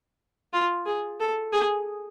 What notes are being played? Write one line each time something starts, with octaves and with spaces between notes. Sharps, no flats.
F4
G#4
A4
G#4